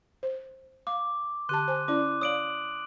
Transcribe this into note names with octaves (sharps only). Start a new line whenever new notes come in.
C5
F5 D6
D3 G4 A5 C6 F#6 D#7
C5 G#5
C#4 E4 D5 D6
C#5 D5 F5 D#6 D7 F#7